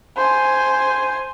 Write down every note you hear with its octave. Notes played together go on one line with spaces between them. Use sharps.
C5 G#5